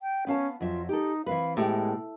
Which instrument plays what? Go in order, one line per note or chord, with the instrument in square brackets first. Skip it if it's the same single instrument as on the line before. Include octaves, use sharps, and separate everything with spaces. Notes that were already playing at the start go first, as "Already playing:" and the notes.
[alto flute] G5
[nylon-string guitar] B3 F5 A5 [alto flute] C#4
[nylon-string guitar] F2 F#3 E5 [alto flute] F4
[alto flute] D#4 [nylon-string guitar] G4 A4
[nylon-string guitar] E3 C4 B4 [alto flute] F5
[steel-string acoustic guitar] A2 [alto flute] G#3 [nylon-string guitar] B3 G4